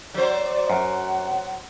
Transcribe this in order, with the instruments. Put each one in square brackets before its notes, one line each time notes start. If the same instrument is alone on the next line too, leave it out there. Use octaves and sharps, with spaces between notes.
[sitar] F#3 C5 [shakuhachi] D5
[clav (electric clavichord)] F#2 [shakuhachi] F#5